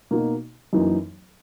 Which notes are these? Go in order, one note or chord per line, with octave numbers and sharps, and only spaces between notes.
B2 A#3 D#4 F#4
F#2 E3 A#3 D#4